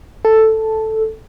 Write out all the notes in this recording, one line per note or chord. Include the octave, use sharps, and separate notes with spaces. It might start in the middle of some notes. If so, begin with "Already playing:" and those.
A4